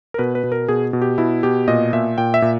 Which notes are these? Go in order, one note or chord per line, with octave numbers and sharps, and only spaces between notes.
A#4
B2 B4
B4
B2
A#4
B2 G#4
B2
G4
B2 E4
B2 G4
A#2 D#5
A#2 E5
A#2 G5
E5
A#2